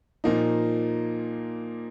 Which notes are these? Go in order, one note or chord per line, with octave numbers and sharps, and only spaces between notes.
A#2 F3 A#3 D#4